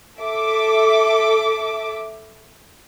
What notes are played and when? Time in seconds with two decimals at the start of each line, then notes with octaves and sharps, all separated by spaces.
0.19 A4 E5 D6